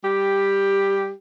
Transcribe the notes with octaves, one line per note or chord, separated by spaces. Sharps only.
G3 G4